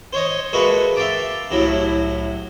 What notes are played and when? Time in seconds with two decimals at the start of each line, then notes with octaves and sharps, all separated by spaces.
0.13 C5 C#5 D#5
0.53 G#3 A#3 F#4 A4 B4 E5
0.96 E5 F5 G5 A5 D6
1.51 C2 A2 F#3 E4